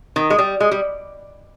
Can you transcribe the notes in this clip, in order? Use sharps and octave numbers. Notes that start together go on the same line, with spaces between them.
D#3
G#3
G3
G#3
G3